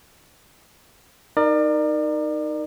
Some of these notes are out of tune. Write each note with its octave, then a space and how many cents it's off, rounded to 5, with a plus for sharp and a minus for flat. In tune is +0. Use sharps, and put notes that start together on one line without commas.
D#4 -5 A#4 +0 D5 +35